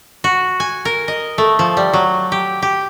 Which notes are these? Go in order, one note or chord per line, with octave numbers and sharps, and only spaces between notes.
F#4
G#5
A#4
D#5
A3
F3
G3
F#3
G4
G4